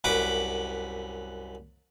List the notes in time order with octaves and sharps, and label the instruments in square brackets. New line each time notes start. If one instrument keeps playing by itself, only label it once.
[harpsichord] C2 F#2 B4 F#5 B5 D6